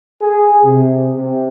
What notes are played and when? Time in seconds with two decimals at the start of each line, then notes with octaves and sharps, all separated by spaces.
0.21 G#4
0.64 C3
1.15 C3